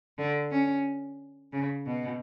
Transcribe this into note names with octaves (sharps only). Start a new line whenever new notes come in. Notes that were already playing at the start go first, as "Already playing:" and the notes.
D3
C#4
C#3
B2